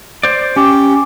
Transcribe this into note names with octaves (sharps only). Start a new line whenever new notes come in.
C5 D5
C#4 G4